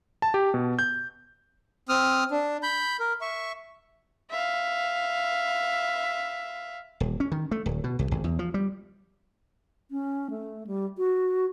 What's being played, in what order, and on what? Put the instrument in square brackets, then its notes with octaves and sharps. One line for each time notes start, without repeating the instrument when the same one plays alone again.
[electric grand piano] A5
G4
B2
G6
[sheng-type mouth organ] C4 D#6 F6
D4
B5 G6
A#4
E5 C#6
[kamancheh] E5 F5
[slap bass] D#1
C#4
D#3
A3
D1
B2
C2
G#1
E2
F3
G3
[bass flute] C#4
A3
G3
F#4